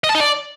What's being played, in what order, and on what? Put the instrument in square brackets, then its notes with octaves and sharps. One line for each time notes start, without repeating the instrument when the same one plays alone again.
[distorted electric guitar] D#5
A5
D#4
D5